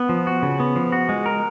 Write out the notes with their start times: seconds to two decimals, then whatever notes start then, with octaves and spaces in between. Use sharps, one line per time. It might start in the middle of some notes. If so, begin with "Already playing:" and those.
Already playing: B3
0.09 F3
0.27 F#4
0.42 C#3
0.60 B3
0.76 F3
0.92 F#4
1.09 G#3
1.26 A#4